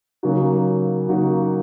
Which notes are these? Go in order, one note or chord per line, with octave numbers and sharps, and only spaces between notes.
C#3 F#3 A#3 D#4 F#4
C#3 F#3 A#3 D#4 F#4